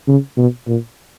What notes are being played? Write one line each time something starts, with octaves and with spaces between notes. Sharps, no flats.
C#3
B2
A#2